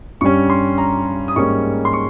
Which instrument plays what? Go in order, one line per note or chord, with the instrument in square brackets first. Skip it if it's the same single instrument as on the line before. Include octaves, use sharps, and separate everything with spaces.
[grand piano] G2 G3 C#4 C#6
C6
A#5
D#6
G#2 G3 A#3 C#4 C#6
C6
C#6